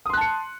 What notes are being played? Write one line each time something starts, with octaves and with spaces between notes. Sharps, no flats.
A5 C6 D#6 F#6 C#7